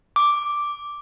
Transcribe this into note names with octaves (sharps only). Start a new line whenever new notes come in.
D6